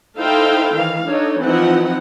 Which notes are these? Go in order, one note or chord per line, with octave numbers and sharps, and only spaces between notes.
D#4 E4 A4 C5 F5 G5
D#3 E3 F5
D4 D#4 A4 C#5
E3 F3 C4 D#4 F#5